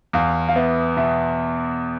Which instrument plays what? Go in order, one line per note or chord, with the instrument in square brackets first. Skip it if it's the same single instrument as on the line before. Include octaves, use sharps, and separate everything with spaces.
[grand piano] E2 [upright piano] F5
[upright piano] F5
[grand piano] B3 [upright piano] E5
[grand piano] B2 [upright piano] E5